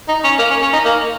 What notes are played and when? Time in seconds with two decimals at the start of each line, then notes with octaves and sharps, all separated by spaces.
0.09 D#4
0.24 C#4
0.39 A#3
0.51 C#4
0.62 C#4
0.73 D#4
0.85 A#3